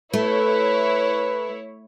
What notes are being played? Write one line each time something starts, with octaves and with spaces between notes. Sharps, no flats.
A3 E4 B4 C#5